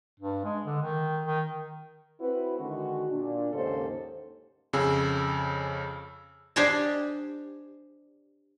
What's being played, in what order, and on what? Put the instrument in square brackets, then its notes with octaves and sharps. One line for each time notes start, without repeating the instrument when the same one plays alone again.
[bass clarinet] G2
G#3
D3
D#3
D#3
[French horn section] C4 E4 F#4 B4
D3 D#3 G#3 F#4
A#2 D4
D#2 G#2 C#3 G4 A4 C5
[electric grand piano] F2 C#3 G#4 E6
[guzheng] D4 G4 C5 D#5 G#5 A5